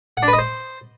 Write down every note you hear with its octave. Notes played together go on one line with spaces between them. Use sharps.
F#5
D4
B4
D#5
C5